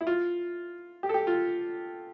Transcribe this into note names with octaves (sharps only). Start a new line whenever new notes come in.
E4
F4
G4
A4
G4
F4